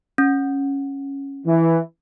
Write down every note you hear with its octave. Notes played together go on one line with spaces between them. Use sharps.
C#4
E3